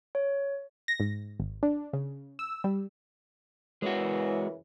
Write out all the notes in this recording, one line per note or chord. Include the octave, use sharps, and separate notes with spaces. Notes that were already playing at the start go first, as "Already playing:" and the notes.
C#5
A#6
G#2
G#1
D4
C#3
E6
G3
F#2 C#3 E3 G#3 F#4